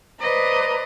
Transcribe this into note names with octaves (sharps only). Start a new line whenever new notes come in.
B4 C5 D5 D#5 A#5